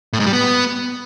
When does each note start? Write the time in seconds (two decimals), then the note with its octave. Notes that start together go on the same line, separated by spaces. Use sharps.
0.13 A2
0.20 G#2
0.26 G3
0.33 B3